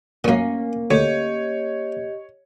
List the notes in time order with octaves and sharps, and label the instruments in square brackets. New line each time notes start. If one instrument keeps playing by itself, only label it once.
[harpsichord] F#2 A#2 [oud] A#3 C#4
[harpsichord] D2 [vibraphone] G4 D#5 [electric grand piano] C#5